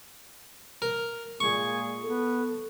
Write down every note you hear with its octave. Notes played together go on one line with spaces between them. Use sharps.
A#4
A#2 G#3 G#4 C#6
B3 A4